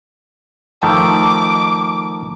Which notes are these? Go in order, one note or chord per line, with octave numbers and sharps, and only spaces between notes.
D#3 F3 A3 D6